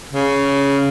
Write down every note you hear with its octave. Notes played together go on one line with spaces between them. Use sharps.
C#3